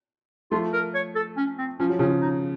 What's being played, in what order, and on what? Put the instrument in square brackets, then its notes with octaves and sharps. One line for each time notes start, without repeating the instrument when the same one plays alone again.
[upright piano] F3 A3 [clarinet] F4
[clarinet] A#4
C#5
A4
C#4
C4
[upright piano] F3 [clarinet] C#4
[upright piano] F#3
[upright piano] C#3 F3 [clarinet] C#4
[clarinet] D#4